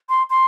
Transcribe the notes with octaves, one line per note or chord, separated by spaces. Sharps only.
C6
C6